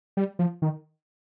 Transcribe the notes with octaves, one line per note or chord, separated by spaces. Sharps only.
G3
F3
D#3